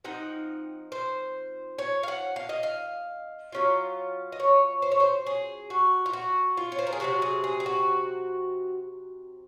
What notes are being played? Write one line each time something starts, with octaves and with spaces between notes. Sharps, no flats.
F3 C4 D#4 F#5
C5
C#5
F5
F#5
F5
D#5
F5
F#3 C#4 F4
D#5
C#5
C5
C#5
C5
G#4
F#4
F4
F#4
F4
C#5
C5
A#4
G#4
C3 F#3 C4 F#4
G#4
G#4
G#4
F#4